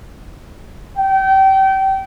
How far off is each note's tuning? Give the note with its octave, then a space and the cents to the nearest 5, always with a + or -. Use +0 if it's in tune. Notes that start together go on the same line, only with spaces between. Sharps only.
G5 -30